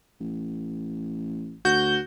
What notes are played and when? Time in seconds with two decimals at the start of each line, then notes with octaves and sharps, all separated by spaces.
0.20 A1
1.65 D2 F#4 G6